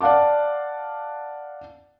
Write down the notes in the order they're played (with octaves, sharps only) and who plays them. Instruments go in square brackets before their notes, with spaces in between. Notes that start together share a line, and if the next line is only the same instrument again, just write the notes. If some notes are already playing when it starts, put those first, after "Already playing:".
[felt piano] D5 F5 F#5 A5 D6